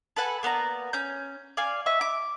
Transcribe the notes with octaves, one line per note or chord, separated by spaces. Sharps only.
A4 B4 F#5 G#5
A#3 B3 D5 A#5
C#4 G6
D5 F5 G#5
D#5 E5 C#6
D6